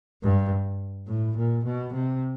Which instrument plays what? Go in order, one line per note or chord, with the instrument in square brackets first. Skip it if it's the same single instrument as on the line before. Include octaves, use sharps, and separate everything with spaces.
[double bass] G2
A2
A#2
B2
C3